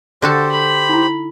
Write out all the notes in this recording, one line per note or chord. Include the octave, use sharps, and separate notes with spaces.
D3 F#4 G4 A4 C5 A5
B5
D#4 E4